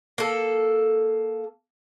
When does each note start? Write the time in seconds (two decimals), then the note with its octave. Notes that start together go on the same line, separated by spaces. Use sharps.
0.18 A#3 A4